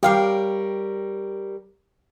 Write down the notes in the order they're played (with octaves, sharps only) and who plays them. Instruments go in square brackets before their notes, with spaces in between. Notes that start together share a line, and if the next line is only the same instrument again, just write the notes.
[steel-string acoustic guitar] G3 A#4 C#5 [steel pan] G4 F5